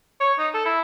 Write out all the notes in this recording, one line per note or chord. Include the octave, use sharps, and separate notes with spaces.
C#5
D#4
A4
E4